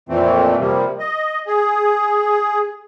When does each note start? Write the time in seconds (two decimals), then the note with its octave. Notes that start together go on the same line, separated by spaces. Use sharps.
0.09 F2 A#2 E3 A3 C4
0.59 C3 F3 G3 A#3
0.99 D#5
1.47 G#4